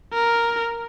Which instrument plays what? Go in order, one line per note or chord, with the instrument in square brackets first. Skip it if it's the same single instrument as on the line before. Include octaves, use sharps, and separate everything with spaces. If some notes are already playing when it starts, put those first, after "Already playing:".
[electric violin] A#4